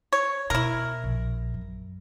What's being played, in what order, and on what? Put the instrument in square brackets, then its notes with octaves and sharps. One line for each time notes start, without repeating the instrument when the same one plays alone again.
[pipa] C#5
[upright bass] B2 [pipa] E4 A#4
[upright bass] A#1
F#2